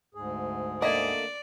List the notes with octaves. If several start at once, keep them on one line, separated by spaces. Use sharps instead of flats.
D2 G#2 G#4
D3 A3 A#3 D5 D#5 G#5